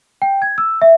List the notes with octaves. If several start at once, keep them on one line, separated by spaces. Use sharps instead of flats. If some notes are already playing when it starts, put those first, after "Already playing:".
G5
G#6
E6
E5